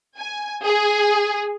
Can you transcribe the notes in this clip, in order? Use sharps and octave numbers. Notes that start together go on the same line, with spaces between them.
G#5
G#4